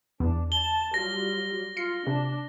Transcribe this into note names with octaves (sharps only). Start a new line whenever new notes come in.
E2 D4
A5 G7
F#3 G3 F4 A#6
F4 C7 C#7
C3 D4